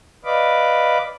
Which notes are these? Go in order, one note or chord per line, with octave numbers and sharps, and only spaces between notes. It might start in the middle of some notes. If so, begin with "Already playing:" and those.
B4 D5 D#5 F5 B5 D6